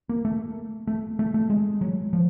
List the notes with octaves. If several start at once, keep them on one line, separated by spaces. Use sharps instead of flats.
A#3
A3
A3
A3
A3
G#3
F#3
F3